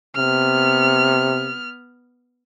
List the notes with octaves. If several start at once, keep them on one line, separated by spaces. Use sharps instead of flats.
C3 B3 F6